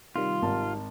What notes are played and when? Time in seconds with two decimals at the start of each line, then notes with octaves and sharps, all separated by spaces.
0.16 C3 D#3 G3 F4
0.42 G#1 A#4 A5